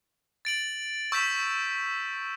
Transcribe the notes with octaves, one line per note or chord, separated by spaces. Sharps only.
A6 D7 F#7
C#6 E6 G6 B6 E7